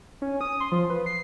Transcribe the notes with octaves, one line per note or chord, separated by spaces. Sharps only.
C#4
D#6
C6
F3
B4
C7